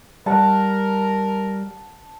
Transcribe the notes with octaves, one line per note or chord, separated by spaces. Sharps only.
G3 A#4 F#5 A5